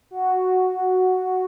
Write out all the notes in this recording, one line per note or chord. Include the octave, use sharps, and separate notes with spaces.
F#4